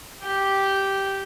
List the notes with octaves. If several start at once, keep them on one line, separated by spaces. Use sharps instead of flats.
G4